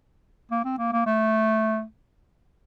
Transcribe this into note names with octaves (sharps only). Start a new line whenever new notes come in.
A#3
C4
A#3
A#3
A3